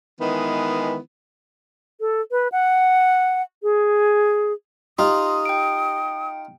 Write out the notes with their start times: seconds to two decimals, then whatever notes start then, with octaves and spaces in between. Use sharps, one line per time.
0.20 D#3 E3 G#3 B3
2.00 A4
2.31 B4
2.52 F#5
3.63 G#4
4.99 D#4 F4 G4 C6 D#6
5.45 G5 D7